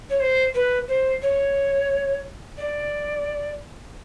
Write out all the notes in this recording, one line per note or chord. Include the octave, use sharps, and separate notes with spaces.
C#5
C5
B4
C5
C#5
D5